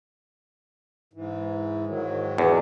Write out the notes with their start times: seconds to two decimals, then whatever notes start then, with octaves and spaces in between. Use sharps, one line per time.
1.13 G#2 E3
1.87 G#2 D#3 F#3
2.38 E2